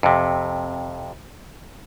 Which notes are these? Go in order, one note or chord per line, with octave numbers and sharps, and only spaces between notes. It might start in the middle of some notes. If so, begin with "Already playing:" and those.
F2 C3